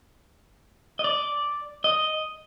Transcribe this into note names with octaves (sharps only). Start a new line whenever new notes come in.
D#5
D5
D#5